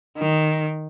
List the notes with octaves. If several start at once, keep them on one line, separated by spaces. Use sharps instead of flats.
D#3